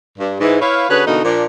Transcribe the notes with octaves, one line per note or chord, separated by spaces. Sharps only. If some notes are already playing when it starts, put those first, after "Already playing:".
G2
G#2 E3
E4 B4 C#5 F5
D3 C#4 F#4 G#4 B4
B2 D3 E3 A#3 D#4 F#4
A#2 F3 D4